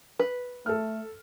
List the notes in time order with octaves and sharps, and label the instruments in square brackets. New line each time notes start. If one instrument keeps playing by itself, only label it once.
[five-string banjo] B4
[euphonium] A3 [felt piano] A4 F6